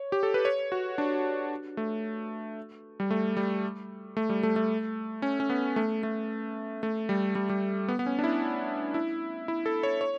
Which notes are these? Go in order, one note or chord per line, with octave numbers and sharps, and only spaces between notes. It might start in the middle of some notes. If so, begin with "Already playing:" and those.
Already playing: C#5
G4
A4
B4
C#5
F#4
D4
A3
G3
A3
G3
A3
G3
A3
A3
C#4
C#4
B3
A3
A3
A3
G3
G3
G3
B3
B3
C#4
D4
E4
E4
E4
A4
C#5
C#5